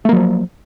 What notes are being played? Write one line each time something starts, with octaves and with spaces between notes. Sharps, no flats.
F3 F#3 A3 A#3